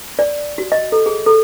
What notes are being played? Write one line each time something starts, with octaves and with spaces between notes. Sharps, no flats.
D5
F#4
D#5
A4
G#4
A4